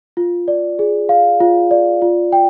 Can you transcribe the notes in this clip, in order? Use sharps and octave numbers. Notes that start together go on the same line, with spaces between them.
F4
D5
G#4
F5
F4
D5
F4
G5